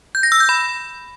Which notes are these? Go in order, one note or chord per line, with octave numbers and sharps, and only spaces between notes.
G6
A#6
E6
G6
B5